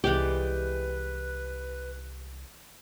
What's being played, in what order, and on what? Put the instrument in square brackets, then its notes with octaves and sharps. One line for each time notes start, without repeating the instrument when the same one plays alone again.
[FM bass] C2 [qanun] E3 G#3 D5 [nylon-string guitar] G4 [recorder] B4